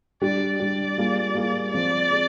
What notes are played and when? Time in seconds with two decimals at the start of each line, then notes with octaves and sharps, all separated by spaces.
0.22 G3 D4 G4 D5
0.60 G3 D4 G4 D5
0.98 G3 A#3 F4 G#4
1.35 G3 A#3 F4 G#4
1.74 F3 G#3 C4 D5
2.11 G#3 C4